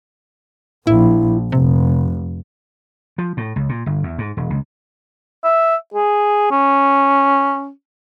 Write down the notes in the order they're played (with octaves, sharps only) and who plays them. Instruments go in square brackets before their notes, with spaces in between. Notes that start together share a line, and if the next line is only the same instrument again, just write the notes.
[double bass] A#1 [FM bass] E4
[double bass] F1 [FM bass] C3
[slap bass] F3
A2
C#2
A#2
G1
E2
G#2
E1
C#2
[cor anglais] E5
G#4
C#4